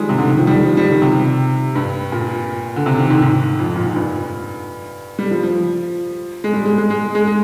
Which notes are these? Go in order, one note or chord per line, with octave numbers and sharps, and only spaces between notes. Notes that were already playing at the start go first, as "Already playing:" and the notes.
Already playing: D#3 F3 G3 G#3
C3
D3
D#3
F3
G3
F3
G3
D#3
C3
G2
A#2
D3
C3
D#3
G#2
G#2
F2
A#2
G#2
G2
G3
F3
F3
G#3
G3
G#3
G#3
G#3
G#3
G#3